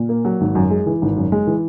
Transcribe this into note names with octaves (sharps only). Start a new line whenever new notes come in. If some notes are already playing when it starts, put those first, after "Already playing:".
Already playing: A#2
A#3
F#3
G#1
F#2
G#3
E3
G#1
F#2
G#3
E3